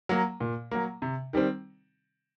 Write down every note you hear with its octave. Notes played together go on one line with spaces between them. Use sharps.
F#3 A#3
A#2
F#3 A#3
C3
D#3 G3 C4